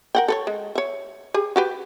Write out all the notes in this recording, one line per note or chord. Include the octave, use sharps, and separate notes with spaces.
A#4 F#5 G5
A4 B4 C#5
G#3
C#5 E5
G4 G#4
F#4 G4 B4